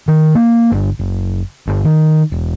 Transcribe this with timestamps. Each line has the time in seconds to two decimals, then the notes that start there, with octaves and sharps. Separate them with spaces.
0.08 D#3
0.35 A#3
0.72 G1
0.99 F#1
1.67 G1
1.85 D#3
2.32 E1